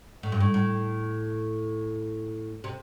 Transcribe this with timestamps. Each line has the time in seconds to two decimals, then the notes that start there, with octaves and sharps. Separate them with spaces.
0.23 A2
0.32 G2
0.40 A2
0.54 A2
2.64 C3